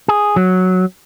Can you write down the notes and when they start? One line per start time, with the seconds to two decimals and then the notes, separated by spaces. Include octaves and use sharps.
0.08 G#4
0.36 F#3